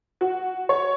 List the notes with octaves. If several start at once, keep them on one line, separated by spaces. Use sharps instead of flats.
F#4
C#5